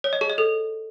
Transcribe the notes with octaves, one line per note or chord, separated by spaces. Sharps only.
C#5
D#5
G#4
D#5
A4